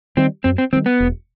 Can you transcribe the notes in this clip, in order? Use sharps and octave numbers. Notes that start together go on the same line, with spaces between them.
D#3 G3 C4
F#2 C4
C4
D#3 G3 C4
B3
E1